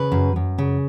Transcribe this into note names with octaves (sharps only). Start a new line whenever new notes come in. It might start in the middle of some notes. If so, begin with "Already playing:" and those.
Already playing: C#3 B4
F#2
F#2
C#3